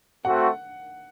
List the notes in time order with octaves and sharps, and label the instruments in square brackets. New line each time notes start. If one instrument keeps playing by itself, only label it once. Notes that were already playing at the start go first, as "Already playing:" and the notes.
[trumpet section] A3 C4 F#4 [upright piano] F#5